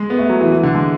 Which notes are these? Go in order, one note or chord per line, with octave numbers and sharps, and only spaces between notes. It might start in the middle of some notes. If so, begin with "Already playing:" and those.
Already playing: G#3
B3
A3
F#3
E3
E3
D3
G#3